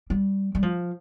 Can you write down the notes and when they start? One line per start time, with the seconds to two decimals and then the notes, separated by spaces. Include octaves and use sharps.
0.10 G3
0.55 G3
0.63 F3